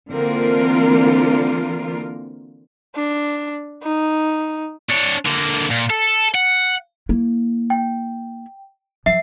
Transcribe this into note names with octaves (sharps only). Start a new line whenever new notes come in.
D3 E3 A#3 C4 F4 A#4
D4
D#4
D4 C#5
D3 A#3
A#2
A4
F#5
A#3 E4
G5
F3 F#3 E5 C7